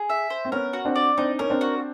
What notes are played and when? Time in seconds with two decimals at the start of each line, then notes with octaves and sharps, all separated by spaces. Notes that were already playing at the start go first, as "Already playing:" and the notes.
Already playing: G#4
0.10 E5
0.30 C5
0.45 C4
0.52 B3 C#4 A#4
0.73 F#4
0.85 C4 D4
0.96 D5
1.18 C4 D4 D#4
1.39 C#4 A#4
1.50 C4 D4
1.61 F#4